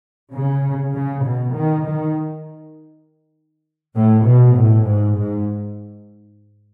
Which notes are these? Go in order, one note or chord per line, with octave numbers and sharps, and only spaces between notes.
C#3
C#3
B2
D#3
D#3
A2
B2
A2
G#2
G#2